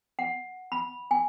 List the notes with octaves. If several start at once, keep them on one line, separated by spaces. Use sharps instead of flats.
F#5
B5
G#5